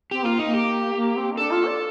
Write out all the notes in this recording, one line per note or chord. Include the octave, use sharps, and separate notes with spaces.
C4 G4
A#3 F4
D#4
A#3
G4
A#3
C4
D#4
D4 A4
F4
D5